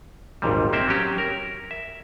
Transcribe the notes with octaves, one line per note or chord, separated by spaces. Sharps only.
G#1 D#2 A#2 G3
A#3 C4 E5 G5
F#3 C#4 G4
A#4
E5